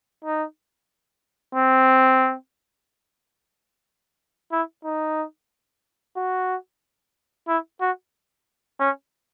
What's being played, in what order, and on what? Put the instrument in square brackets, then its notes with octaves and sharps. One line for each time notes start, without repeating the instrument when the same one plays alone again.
[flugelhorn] D#4
C4
E4
D#4
F#4
E4
F#4
C#4